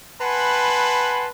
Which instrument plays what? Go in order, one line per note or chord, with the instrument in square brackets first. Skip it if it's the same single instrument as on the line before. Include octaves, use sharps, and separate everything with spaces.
[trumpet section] B4 F#5 G#5 A5 B5 C6